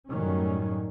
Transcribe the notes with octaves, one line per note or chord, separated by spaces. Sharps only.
F#2 A2 D#3 F#3 G3 C#4